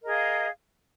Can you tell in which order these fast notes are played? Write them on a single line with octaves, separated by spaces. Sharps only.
A#4 D#5 G#4 F5